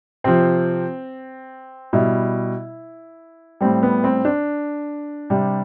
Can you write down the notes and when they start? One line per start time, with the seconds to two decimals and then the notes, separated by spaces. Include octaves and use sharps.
0.24 C3 F3 C4
1.93 B2 G3 E4
3.61 A2 G3 C4
3.83 B3
4.04 C4
4.25 D4
5.30 C3 G3